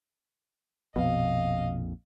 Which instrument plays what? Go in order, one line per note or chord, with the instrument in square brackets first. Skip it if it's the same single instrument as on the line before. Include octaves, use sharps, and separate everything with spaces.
[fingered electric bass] A#1 F2 [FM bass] B2 [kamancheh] D#5 F5